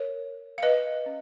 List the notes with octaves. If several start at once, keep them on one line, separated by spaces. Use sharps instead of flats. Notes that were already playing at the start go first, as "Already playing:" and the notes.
Already playing: A#4 C#5
F5
B4 D#5
C#4